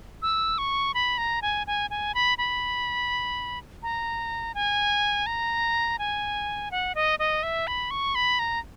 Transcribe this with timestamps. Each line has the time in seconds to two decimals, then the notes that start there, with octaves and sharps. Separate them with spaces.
0.22 E6
0.58 C#6
0.94 B5
1.18 A#5
1.42 G#5
1.67 G#5
1.90 G#5
2.15 B5
2.38 B5
3.83 A#5
4.55 G#5
5.26 A#5
5.99 G#5
6.71 F#5
6.95 D#5
7.19 D#5
7.43 E5
7.67 B5
7.91 C#6
8.15 B5
8.39 A#5